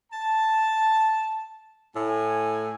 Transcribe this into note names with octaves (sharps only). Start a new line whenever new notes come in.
A5
A2 G#5